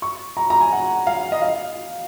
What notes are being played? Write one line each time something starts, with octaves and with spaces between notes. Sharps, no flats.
C#6
A#5
A#5
G#5
F#5
F5
D#5
F5